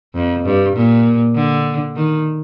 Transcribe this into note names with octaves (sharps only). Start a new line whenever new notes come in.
F2
G2
A#2
D3
D#3